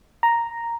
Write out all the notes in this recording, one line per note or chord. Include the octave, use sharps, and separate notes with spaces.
A#5